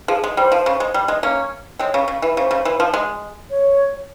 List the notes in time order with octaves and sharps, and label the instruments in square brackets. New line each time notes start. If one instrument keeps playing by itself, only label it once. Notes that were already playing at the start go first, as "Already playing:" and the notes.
[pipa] F3 [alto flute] G#4
[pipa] G#3
[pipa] G3 [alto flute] C5
[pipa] F3
C#3
G#3
G3
G#3
A#3 C#4
[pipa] G#3 C4 [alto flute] C#5
[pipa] C#3
C#3
E3
[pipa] C#3 [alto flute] C5
[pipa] C#3
E3
F3
G#3
[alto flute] C#5